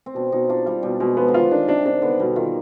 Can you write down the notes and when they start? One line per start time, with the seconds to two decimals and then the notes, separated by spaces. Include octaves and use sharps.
0.06 C4
0.15 B2 D4
0.32 B2 D#4
0.49 D4 F4
0.66 G3 F4
0.83 B2 G3
1.00 B2 G#3
1.17 F3 B3
1.28 D3
1.34 D#3 F4
1.51 D#3 D4
1.68 C3 D4
1.86 C3 D4
2.02 D3 B3
2.20 B2 G3
2.36 D#3 F4